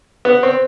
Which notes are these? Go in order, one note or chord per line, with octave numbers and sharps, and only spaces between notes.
B3
C4